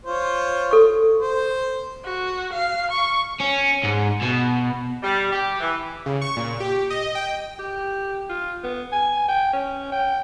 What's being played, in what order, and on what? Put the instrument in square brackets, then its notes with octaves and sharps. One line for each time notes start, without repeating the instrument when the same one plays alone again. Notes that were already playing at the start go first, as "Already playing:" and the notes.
[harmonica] F4 C5 C#5
[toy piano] A4 C#6
[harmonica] C5
[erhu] F#4
F5
C#6
[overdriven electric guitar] C#4
G#2
B2
[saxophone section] G3
G4
E3
[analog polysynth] C#3
C#6
A#2
G4
D#5
G5
[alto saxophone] G4
F4
B3
G#5
G5
C#4
G5